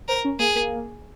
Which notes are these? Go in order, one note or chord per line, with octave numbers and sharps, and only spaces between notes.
A#4 C5
C#4
A#3 G#4
A#3